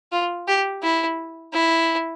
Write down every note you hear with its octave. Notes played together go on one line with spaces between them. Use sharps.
F4
G4
E4
E4